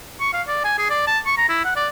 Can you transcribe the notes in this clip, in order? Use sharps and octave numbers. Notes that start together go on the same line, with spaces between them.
C#6
F5
D5
G#5
G#4
D5
A5
C#6
A#5
E4
F#5
D5